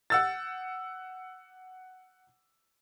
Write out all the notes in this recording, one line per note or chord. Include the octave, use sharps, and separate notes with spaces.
F#5 E6 A6